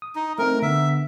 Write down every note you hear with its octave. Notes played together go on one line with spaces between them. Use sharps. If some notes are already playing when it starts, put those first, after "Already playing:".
D#6
D#4
A3 C4 D#4 A#4
D3 B3 E5